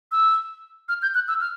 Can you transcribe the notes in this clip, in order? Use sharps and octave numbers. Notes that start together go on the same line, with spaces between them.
E6
F6
G6
F#6
E6
F6